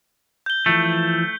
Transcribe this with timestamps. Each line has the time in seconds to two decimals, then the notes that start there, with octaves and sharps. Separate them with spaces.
0.46 G6 G7
0.66 E3 F3 A3